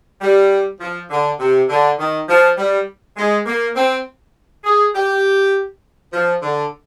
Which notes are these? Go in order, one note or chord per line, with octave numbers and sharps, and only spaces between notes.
G3
F3
D3
C3
D3
D#3
F3
G3
G#3
A#3
C4
G#4
G4
F3
D3